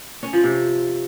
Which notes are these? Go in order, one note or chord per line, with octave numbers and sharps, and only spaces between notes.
C#4
F3
C3